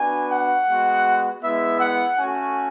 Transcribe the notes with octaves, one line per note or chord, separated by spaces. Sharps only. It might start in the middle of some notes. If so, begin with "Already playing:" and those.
Already playing: B3 D4 F#4 G#5
F#5
G#3 B3 F#4
G#3 B3 E4 E5
F#5
A3 C#4 F#4 G#5